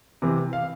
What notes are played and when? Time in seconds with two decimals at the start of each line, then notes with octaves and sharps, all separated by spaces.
0.22 C3 E3
0.53 F5